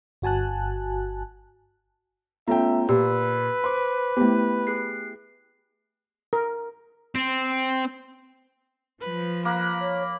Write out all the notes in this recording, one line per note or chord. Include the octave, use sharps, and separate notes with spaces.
G1 F#4 G#5 A5 F#6
A3 B3 C#4 F4 E5 G5 A#5
A#2 G4 B4 E6
C5 C6 D6
A3 B3 E4 G4
G#4 F#6 C7
A#4
C4
F3 B4
A#3 B5 F#6
C#5